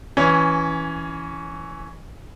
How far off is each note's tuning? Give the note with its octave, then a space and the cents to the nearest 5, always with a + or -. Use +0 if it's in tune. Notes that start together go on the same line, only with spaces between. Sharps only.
E3 +0 C#4 +5